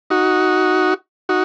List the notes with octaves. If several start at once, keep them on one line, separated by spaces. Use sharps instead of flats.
D#4 F#4
D#4 F#4